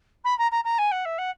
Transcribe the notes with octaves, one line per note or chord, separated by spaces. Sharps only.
B5
A#5
A#5
A#5
G#5
F#5
E5
F#5